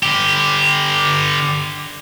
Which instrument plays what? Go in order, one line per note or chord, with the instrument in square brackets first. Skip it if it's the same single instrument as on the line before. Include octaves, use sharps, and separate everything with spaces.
[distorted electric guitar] D3 G4